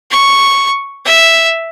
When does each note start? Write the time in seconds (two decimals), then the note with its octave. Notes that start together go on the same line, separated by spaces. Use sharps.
0.11 C#6
1.05 E5